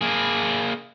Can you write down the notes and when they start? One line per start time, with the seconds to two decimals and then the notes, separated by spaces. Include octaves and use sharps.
0.01 A#3 G#4